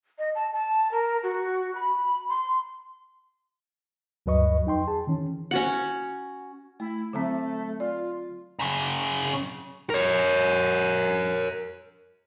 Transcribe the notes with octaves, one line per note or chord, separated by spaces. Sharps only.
D#5
A5
A5
A#4
F#4
B5
C6
D2 G2 F#3 B4 D#5 C#6
F2 D#4 G5 C6
G#4 A5
D#3 E3 C#4
C#4 F#4 F#5
A3 E4
D3 F#3 A3 C4
F4 D5
F#2 C#3
A#4 C#5